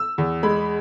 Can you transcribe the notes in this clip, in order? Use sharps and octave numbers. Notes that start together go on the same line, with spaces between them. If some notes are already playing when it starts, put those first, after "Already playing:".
Already playing: E6
E2
G#3 B5